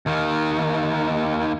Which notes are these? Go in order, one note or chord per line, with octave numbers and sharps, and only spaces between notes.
D#2 D#3